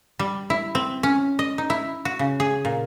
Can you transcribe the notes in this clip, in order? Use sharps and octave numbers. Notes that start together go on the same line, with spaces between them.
G3
E4
C4
C#4
D#5
D#4
E4
F#4
C#3
G#4
A#2